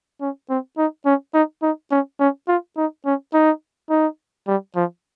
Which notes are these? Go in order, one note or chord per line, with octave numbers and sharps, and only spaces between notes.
C#4
C4
D#4
C#4
D#4
D#4
C#4
C#4
F4
D#4
C#4
D#4
D#4
G3
F3